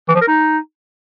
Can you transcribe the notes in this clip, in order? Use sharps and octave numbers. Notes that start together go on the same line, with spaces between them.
E3
F3
A#4
D#4